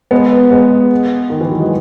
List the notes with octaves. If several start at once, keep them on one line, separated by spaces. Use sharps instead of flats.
G#3 B3
G#3 B3
D#3
E3
F#3
G#3